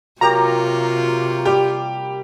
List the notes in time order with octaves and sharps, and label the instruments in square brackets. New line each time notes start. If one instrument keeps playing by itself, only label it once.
[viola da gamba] C3 F4 [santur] F#3 A#3 G4 [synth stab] A#5
[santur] G3 [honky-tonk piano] G4